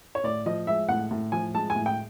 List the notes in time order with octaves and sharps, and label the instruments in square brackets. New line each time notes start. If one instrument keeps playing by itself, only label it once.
[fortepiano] C#5
A2 D5
F3 D#5
G#3 E5
A2 F#5
A2
F3 G#5
G#3 A5
G#5
A2
G5